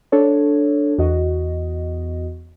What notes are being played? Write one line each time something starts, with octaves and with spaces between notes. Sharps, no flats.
D4 A4 C#5
E2 F#4 D#5